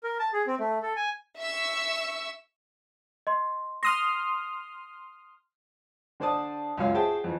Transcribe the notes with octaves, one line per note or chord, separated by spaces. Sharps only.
A#4
A5
G#4
C4
A3
A4
G#5
E5 C#6 E6
D#5 C6
C6 D#6 F6 A#6
D3 D4 C5 D5 A5 D#6
C#2 F#2 C#5 F5
F#4 G#4 C5 E5 G5 A5
F2 E3